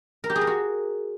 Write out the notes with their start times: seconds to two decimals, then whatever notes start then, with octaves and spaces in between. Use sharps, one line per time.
0.24 A#4
0.30 G4
0.35 G#4
0.41 A#4
0.47 F#4